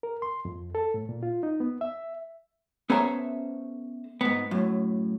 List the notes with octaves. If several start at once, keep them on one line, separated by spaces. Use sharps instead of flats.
A#4
C6
F2
A4
A2
A#2
F4
D#4
B3
E5
B3 C#4 A4 C5 E5 A#5
G#2 B3
F#2 A2